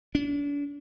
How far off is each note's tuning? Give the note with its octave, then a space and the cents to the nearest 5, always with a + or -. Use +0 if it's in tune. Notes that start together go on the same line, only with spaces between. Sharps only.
D4 -40